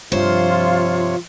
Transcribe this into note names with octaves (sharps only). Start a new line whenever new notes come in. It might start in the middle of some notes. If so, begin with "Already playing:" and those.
G2 C3 F3 F4 C5 C#5